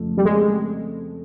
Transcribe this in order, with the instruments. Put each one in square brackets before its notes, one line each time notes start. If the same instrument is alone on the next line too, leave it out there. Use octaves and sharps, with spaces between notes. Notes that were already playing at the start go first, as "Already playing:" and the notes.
Already playing: [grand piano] F2 C#3 F3 A3
[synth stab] G3
G#3